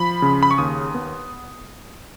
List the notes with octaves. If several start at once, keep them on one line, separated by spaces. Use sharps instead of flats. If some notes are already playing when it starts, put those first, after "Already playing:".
Already playing: F3 B5
C#3
B5
C#6
D#2 D#6
B3